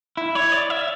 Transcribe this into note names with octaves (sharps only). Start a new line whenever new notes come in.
E4
C#5
D5
E5